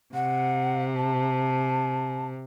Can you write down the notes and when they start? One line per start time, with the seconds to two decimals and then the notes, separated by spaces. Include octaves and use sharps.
0.14 C3 F#5
0.96 A5